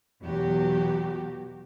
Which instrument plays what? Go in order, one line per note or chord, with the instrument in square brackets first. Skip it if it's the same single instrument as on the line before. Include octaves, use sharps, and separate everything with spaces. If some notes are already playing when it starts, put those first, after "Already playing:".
[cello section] E2 B2 F#3 F#4 G4